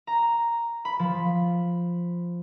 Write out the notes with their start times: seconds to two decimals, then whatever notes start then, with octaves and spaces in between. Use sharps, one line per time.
0.07 A#5
0.85 B5
0.99 F3